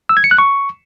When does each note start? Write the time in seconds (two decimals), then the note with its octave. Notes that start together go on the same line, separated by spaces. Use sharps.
0.09 E6
0.17 G#6
0.24 C#7
0.31 F#6
0.38 C#6